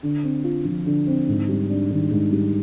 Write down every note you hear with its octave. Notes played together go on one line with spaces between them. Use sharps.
D3
C4
F4
F3
D3
C4
G#2
G3
D4
D#3
G#2
G3